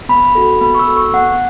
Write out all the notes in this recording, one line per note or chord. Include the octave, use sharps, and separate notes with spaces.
B3 B5
F#4 A4
B3 B5
C#6
E6
F#4 A4
C#6
B3 F#5